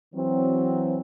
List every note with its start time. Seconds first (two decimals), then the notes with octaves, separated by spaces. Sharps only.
0.14 E3 F#3 C4